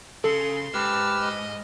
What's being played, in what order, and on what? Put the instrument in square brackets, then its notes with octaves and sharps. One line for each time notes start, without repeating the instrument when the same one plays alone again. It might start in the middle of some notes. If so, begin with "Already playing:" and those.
[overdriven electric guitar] C#3 [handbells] A4 [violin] C6
[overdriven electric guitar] G#2 [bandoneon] G4 B4 F6 [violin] A5 E6
[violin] D#5